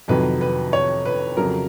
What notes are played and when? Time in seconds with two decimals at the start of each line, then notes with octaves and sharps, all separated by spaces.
0.08 F2 C3 D#3 F#3 B4
0.41 B4
0.73 C#5
1.05 B4
1.37 F2 C#3 F#3 A#4